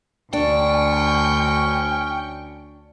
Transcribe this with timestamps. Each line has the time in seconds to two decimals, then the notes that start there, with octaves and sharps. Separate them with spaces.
0.33 D2 C#4 D4 G5 C#6